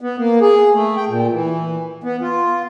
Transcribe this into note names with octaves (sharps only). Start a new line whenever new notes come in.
B3
A#3
G#4
A3
G5
A#2
E3
B3
F4